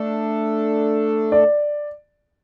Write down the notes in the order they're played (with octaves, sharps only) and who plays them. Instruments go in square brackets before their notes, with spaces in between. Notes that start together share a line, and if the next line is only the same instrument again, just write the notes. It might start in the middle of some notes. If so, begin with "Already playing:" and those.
Already playing: [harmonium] A3 D4 A4
[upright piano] D5